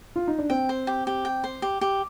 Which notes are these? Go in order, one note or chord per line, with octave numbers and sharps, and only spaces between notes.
F4
D#4
D4
C4 G5
C5
G4
G4
G5
C5
G4
G4